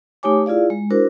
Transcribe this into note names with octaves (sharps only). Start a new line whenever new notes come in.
A3 D#4 G4 C#5 G#5 D6
E4 F4 G#4 D5 F5
G#3
D4 E4 F#4 A#4 C5